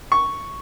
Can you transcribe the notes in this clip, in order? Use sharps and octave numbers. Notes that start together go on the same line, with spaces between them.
C#6